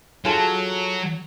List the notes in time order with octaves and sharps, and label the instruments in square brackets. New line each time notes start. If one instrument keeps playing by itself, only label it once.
[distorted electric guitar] F#3 [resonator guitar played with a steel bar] F4 G#4 A4